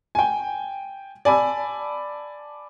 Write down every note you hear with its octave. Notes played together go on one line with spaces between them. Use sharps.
G5 G#5
D5 G#5 A5 B5 E6